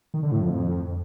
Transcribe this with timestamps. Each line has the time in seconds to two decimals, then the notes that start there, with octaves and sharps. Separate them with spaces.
0.14 D#3
0.23 D3
0.32 A2
0.41 F2